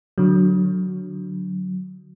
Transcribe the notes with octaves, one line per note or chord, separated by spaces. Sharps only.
D3 F#3